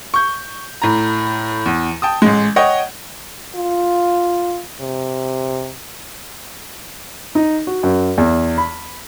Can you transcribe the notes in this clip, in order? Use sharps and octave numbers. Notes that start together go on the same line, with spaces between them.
C#6 G6
A2 A#5
E2
G5 A5 D#6
A1 G#3
C#5 D#5 F#5 G5
F4
C3
D#4
F#4
F#2
E2
B5